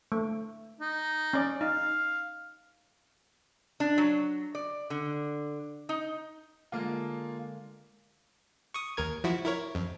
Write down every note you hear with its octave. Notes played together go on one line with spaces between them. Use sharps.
A3
D#4
C#4 D5
D#4 F5
D4
F#3
D5
D3
D#4
D3 G#3 A#3 F4 A#4
C#6 D#6
D#2 A#4 G#6
F3 E4 F#4
E4 A#4 C#5
F2